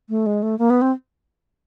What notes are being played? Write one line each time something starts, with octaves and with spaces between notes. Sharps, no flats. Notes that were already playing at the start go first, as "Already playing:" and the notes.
A3
G#3
A3
A#3
B3
C4